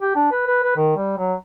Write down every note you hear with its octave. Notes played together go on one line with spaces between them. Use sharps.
G4
D4
B4
B4
B4
D#3
G3
F#3